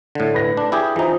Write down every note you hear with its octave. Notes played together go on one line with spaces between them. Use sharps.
A2 D3
B4 A#6
D4
E4 G4 G#4
E3 D#4 F4 C5